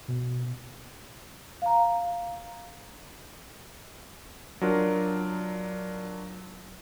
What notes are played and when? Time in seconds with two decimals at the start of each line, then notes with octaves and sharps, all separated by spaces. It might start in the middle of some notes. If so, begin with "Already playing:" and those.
0.08 B2
1.62 F5 A#5
4.61 F#3 D4 F4 A#4